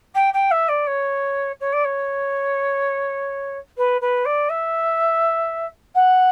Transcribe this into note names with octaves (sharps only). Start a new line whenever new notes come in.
G5
G5
E5
D5
C#5
C#5
D5
C#5
B4
B4
D5
E5
F#5